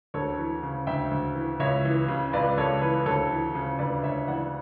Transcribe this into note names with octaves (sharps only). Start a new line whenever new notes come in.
D2 A4 C#5
E3
C#3
D2 E5 G5
D2
E3
C#2 C#5 E5
E3
C#3
C#2 B4 D5
C#2 A4 C#5
E3 B4
D2 A4 C#5
E3
C#3
D2 B4 D5
D2 C#5 E5
E3 D5 F#5